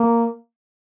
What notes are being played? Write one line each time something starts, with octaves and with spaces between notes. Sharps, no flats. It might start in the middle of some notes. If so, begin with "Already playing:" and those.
Already playing: A#3